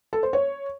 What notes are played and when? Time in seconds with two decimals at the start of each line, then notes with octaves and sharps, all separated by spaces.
0.13 A4
0.23 C5
0.33 C#5